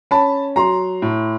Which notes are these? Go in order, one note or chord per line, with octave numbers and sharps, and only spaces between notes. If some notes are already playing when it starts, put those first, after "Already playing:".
C#4 A5 B5
F#3 A#5 C6
A2